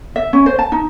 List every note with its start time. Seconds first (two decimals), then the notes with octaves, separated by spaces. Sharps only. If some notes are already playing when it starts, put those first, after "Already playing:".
0.16 E5
0.33 C#4
0.46 C5
0.59 A5
0.72 D#4